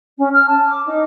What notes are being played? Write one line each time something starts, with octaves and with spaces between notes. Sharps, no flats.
C#4
F6
A5
D6
D#4